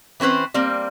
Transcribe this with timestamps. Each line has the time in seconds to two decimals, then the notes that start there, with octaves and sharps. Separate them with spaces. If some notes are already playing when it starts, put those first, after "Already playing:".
0.20 E3 C4 C#4 B4 C5
0.54 G3 A#3 C4